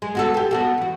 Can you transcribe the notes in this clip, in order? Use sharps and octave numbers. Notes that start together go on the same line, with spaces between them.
G#3
B3 F#4 A4
G4 A4
B3 F#4 A4
E2 F#4